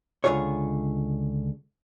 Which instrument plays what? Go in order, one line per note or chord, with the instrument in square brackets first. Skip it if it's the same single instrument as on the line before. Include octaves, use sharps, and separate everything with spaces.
[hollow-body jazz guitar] C#2 G#2 D3 F4 G#4 C#5